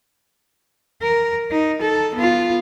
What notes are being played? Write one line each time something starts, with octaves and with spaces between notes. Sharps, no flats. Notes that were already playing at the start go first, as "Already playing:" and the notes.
A#4
D#4
A4
B3 F4